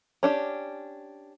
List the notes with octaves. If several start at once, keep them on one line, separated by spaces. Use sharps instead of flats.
C#4 D4 G4